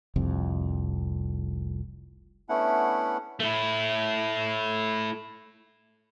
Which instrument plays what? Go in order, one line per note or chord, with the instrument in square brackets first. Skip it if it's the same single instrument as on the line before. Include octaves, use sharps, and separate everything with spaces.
[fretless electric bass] F1 C2 F2
[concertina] A3 B3 C#4 D4 E4 F#5
[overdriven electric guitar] A3 E4